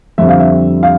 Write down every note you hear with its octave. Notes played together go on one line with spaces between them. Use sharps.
F2 D3 G3 C4 E5
F5
E5
F5